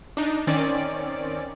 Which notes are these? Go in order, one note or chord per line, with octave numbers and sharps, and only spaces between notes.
D4 D#4
D#3 C4 C#4 D5